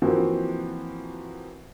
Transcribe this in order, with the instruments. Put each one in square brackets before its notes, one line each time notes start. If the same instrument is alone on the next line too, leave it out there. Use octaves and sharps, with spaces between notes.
[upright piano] E3 F3 A#3 C4 F#4